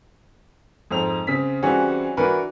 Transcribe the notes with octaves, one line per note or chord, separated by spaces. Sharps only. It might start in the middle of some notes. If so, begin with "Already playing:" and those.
F2 G#2 C5 F7
C#3 C4 B6
E3 G3 C4 C#4 F#4 G#4
E3 D4 F#4 A#4 B4